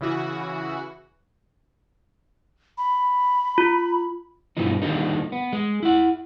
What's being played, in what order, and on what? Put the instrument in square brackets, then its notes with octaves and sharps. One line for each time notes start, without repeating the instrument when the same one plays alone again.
[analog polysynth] C#3 E3 F#4
[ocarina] B5
[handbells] F4
[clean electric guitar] G2 B2 E3 F3 D#4
D3 D#3 F3 G3 A#3 D#4
B3
G#3
E4 F#5